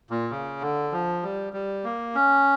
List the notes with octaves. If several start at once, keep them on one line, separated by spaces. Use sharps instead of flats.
A#2
C#3
D3
F3
G3
G3
A#3
C#4